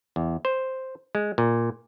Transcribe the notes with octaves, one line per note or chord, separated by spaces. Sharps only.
E2
C5
G#3
A#2